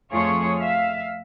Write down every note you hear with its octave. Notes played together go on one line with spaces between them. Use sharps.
F2 A3 F4 G#4 C#5
E5 F5